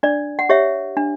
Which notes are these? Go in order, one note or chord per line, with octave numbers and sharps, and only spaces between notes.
D4 D5
F#5
G4 C#5 E5
D4